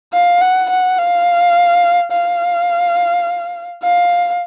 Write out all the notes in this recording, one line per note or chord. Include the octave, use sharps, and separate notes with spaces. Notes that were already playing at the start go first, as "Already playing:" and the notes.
F5
F#5
F#5
F5
F5
F5